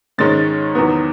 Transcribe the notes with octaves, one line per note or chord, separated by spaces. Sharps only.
G#2 D#3 G#3 C#4 A6
E2 D#3 F#3 B3